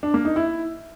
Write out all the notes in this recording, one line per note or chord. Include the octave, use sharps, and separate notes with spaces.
D4
A#3
D#4
E4